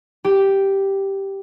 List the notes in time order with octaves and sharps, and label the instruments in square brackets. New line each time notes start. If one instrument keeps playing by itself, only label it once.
[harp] G4